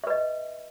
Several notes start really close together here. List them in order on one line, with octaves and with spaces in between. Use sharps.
E5 B4 D#5